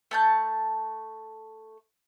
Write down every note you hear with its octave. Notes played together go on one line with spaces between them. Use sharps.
A3 A5 G6